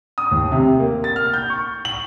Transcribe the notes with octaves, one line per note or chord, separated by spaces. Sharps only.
D#6
D#2
C3
A#3
A6
F6
G6
C#6
F#7